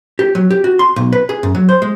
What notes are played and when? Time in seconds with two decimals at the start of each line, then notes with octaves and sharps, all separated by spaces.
0.19 G4
0.35 F#3
0.51 G4
0.64 F#4
0.79 C6
0.96 B1
1.13 B4
1.29 G#4
1.43 F#2
1.55 F#3
1.69 C5
1.82 G#3